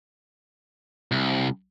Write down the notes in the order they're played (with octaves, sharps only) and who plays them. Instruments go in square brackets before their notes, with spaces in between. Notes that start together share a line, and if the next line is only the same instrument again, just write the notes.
[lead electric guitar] C2